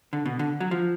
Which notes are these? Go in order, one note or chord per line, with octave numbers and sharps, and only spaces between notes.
D3
B2
D3
F#3
F3